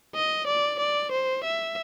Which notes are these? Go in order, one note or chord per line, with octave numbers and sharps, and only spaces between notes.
D#5
D5
D5
C5
E5